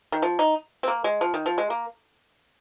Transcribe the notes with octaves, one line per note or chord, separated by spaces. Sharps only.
D#3
F3
D#4
C4
A#3
G#3
F3
D#3
F3
G#3
A#3